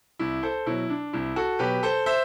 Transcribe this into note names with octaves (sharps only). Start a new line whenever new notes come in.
C2 E4
A4 C5
B2 F#3 E4
D4
C2 E4
F#4 A4
B2 F#3 G4 B4
A4 C5
C5 E5